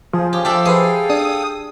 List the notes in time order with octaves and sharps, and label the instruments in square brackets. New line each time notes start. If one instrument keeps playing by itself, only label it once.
[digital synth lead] F3 [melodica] G#4
[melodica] C#4 G#4 [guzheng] G4
[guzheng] G4 D5 E5 [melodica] A4 F5 G5
[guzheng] G#4 [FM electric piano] B4 C5 D#6
[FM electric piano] D4 [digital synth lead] D#6